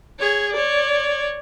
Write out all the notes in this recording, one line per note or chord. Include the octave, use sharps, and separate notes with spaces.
G#4 C#5
C#5 D5